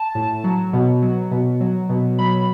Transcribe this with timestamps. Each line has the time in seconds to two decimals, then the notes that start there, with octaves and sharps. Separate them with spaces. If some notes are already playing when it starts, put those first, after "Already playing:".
Already playing: A5
0.15 A2
0.44 F#3
0.73 B2
1.02 F#3
1.31 B2
1.60 F#3
1.89 B2
2.19 F#3 B5